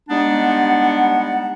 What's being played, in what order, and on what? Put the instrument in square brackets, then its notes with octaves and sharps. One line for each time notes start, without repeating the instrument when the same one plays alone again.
[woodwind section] G3 G#3 B3 D4 D#4 F#5